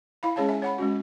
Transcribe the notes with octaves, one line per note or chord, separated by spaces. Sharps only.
E4 F5 B5
G#3 C#4 G#4 C#5 F5 A5
E5 G#5
C#5 F#5 B5
G#3 C#4 F#4